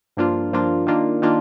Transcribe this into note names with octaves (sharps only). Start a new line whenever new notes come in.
G2 F3 A#3 D4 F4
G2 F3 A#3 D4 F4
D#3 A#3 D4 F4
D#3 A#3 D4 F4